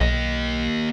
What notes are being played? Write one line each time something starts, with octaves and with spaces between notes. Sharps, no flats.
B1 A#3 D#5